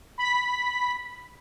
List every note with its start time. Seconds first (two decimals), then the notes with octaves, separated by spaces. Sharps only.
0.18 B5 B6